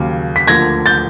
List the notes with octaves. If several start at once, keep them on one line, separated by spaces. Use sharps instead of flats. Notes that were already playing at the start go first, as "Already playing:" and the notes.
Already playing: D#2 C#3 F#3
B6
D2 D3 F3 A#3 G#6 A#6
G6 A6